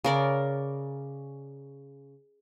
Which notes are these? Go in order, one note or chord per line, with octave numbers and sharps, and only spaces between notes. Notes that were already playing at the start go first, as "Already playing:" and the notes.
C#3 A#4 D5